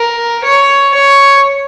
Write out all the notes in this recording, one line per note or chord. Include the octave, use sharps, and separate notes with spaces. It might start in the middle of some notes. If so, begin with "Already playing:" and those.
Already playing: A#4
C#5
C#5